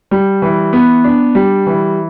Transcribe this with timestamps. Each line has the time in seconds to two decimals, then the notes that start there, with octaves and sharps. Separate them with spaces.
0.11 G3
0.42 E3
0.73 B3
1.04 D4
1.35 G3
1.67 E3